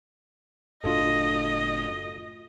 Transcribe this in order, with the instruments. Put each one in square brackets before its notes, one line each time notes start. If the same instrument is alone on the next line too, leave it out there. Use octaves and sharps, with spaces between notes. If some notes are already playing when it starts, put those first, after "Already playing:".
[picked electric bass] F#1 A2 D4 [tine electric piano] F4 F#4 A4 [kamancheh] D#5